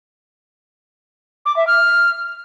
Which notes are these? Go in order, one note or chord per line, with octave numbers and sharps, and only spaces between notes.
D6
E5
F6